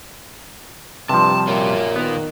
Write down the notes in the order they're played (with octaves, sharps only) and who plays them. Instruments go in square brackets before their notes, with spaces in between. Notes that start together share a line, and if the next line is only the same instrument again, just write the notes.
[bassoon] G2 [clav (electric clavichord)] C3 F3 [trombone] G3 [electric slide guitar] A5
[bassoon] F#2 [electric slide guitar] A#2 F4
[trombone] D#3 [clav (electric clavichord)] B3 A#5